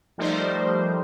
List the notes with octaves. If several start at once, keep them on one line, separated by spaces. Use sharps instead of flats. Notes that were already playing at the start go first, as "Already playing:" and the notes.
F3 G3 A3 D#4 A#4 C5